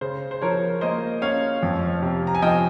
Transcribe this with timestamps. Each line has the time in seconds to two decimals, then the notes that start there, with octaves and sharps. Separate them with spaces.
0.01 C#3 C5
0.31 C5
0.42 F3 A#4 C#5
0.81 A#3 C5 D#5
1.22 C#4 C#5 F5
1.63 F2
2.02 C3
2.27 A#5
2.35 G#5
2.42 F3 D#5 G5